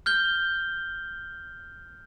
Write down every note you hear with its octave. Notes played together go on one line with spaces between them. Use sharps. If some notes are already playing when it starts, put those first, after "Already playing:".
F6 G6 G7